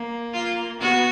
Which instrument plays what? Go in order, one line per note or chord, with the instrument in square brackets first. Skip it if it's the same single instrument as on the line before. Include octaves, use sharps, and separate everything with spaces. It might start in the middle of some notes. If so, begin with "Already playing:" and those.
Already playing: [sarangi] A#3
[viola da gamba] F4
[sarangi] B3 [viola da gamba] F#4